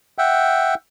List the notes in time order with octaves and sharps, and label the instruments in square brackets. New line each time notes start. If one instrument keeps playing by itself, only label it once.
[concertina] E5 F#5 G5